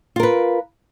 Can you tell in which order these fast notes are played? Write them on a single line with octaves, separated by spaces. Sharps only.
F4 A#4 B4